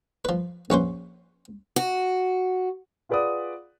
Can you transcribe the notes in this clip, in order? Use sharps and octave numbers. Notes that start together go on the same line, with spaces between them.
F3 B4
A#1 C#4 B4 C5
F#4
F4 G#4 B4 D5 F#5 D#6